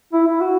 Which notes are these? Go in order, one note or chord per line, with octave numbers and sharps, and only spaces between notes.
E4
E4
F#4